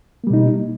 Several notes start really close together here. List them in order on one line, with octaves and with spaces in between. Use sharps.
A#3 G3 B2 D#4